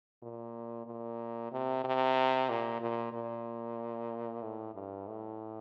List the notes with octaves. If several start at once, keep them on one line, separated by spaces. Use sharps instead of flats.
A#2
A#2
C3
C3
A#2
A#2
A#2
A2
G2
A2